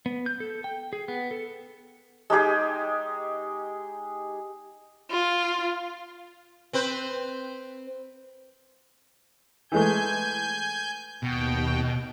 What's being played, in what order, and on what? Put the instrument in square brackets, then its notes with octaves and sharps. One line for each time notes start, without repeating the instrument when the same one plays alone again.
[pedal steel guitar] B3
G6
A4
G5
G#4
B3
A4
[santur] G#3 D#4 G4 G#4
[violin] F4
[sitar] C4 B4 C5
[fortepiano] E3 G#3 A3 [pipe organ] G#5 G6
[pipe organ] D#2 G5 [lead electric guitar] B2